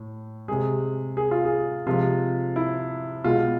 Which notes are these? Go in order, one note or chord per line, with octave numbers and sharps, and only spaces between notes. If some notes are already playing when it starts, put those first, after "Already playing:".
Already playing: A2
C3 G#3 G#4
G#4
F4
G#4
C3 F3 G#3 F4
E4
B2 G#3 F4